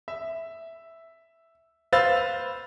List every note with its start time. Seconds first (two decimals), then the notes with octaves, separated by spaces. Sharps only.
0.08 E5
1.92 B4 C5 F5 E6 A6